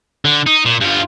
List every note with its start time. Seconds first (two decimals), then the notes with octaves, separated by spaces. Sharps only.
0.25 D3
0.46 D#4
0.66 A#2
0.81 G2 F4